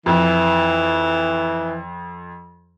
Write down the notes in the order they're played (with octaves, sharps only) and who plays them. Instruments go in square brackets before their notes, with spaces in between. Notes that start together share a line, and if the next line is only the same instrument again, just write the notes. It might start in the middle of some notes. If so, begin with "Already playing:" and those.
[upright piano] F2 [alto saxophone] E3